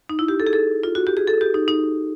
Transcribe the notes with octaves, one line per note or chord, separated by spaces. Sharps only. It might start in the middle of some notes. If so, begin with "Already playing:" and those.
D#4
E4
G4
A4
G#4
A4
F4
F#4
G4
G#4
A4
G4
D#4
D#4